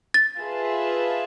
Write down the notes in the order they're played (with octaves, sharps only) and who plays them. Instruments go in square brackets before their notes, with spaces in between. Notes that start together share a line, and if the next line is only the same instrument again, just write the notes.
[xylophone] A6
[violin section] F4 G#4 B4 E5 A5